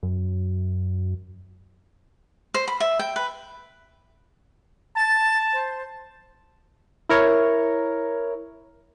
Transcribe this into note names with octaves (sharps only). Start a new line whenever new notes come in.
F#2
C5
B5
E5
G5
B4
A5 A6
C5
E4 A#4 C#5